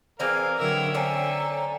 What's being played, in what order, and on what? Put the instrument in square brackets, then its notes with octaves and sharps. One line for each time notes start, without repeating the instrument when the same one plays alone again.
[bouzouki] E3 C4 D5 [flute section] G#4 G#6 [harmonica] A#4 F5
[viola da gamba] D3 F#3 A#4 [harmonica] E5 [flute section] G5 E6
[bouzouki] D3 C4 C#4 [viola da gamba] A4 [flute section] G5 G#5 A#5